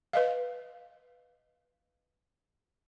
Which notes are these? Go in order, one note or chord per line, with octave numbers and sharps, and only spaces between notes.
B4 D#5 F5